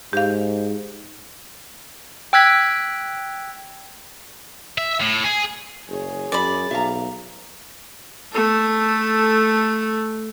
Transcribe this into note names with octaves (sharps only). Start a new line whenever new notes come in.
G#2 G4 F5
G5 E6 F#6 G#6 B6
E5
A2
G#4
F#1 G#4 C#5
F#2 D5 B5
B1 E5 F5 A#5
A3 A4